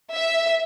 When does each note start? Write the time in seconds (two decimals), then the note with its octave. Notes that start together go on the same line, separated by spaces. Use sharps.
0.14 E5